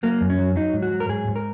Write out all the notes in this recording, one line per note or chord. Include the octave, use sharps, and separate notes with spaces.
F#3 A#3
F#2
C#4
F#3
F#3 D#4
G#2
F#4
F#3
A#4
G#2 G#4
G#2
A#4